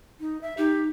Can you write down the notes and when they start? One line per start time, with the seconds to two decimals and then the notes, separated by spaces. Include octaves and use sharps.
0.20 D#4
0.41 E5
0.58 D#4 G4